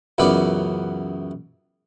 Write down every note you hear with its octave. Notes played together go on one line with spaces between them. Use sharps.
C#2 F#2 E3 B3 B4 D5